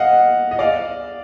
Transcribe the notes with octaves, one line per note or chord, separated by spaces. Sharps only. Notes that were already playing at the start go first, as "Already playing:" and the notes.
Already playing: D#5 F5 F#5
D#5
D5 F5